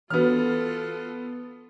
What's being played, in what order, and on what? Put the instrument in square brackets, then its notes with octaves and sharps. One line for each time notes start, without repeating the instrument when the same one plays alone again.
[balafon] E3 D4 F#4 [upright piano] B3 F6 [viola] F4 A4